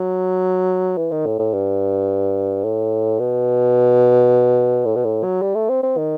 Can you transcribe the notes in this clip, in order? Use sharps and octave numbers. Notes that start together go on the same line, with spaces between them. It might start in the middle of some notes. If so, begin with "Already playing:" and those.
Already playing: F#3
E3
D#3
A2
A2
G2
A2
B2
A2
B2
A2
F#3
G3
A3
C4
C4
D#3